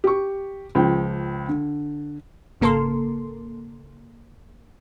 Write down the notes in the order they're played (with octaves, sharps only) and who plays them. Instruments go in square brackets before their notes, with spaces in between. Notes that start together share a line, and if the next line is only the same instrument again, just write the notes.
[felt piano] G4 C#6
C#2 F3 G5
D3
[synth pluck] G#1 C#3 A#3 A4 A#4 C6